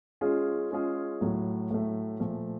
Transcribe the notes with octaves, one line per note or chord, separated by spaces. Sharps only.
G#3 C#4 F4 G#4
G#3 C#4 F4 G#4
A2 F#3 A3
A2 F#3 A3
A#2 F3 A3